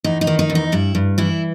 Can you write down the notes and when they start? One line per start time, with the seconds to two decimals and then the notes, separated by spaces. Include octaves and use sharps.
0.04 E2 D#4
0.21 D#4
0.27 D#3
0.39 D#4
0.50 E2
0.55 D#4
0.72 G2 E4
0.95 G2
1.18 E3 E4